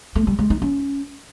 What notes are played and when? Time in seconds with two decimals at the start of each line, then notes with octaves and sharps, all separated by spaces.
0.15 A3
0.27 G3
0.39 G#3
0.50 D#4
0.62 C#4